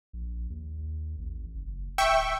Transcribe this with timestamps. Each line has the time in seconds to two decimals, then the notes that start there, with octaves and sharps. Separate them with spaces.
0.13 A#1
0.50 D#2
1.18 A1
1.54 F#1
1.98 D1 E5 G5 C#6